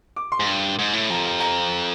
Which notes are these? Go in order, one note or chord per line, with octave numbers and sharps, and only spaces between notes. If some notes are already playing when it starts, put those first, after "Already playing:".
D6
C6
G#2
G2
G#2
A2
F2 A#5
A#5
A#5